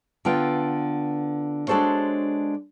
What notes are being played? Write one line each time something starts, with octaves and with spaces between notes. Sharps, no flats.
D3 B3 F4 G5
G#3 D4 F#4 A4 C5 C#5